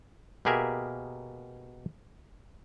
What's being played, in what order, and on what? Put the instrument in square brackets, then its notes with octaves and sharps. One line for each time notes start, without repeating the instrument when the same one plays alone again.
[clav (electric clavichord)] B2 A#3 G4 G#4 A#4 E5